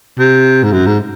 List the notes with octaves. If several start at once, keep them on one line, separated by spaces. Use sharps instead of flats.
C3
G#2
F#2
G#2